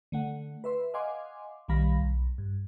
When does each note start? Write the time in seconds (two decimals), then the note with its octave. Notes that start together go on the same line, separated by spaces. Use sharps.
0.12 D3 A3 F#5
0.64 B4 E5 C6
0.94 D#5 F5 F#5 G#5 C6 D6
1.68 B1 D#3 G3 F5 B5 A#6
2.01 B1
2.38 G2